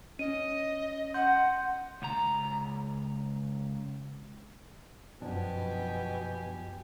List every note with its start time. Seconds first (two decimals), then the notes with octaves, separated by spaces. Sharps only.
0.19 C#4 D#5 D#7
1.14 F#5 C6 G6
2.02 C#2 A#5
5.22 F#2 B2 F3 B3 D4 G4 G#5